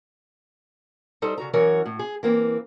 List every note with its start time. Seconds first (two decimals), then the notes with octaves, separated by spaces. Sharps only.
1.22 G3 D#4 A4 C5
1.38 C#3 F#4 A#5
1.53 F#2 E3 F#4 A#4 C#5
1.85 A2
1.99 G#4
2.23 E3 A#3 C4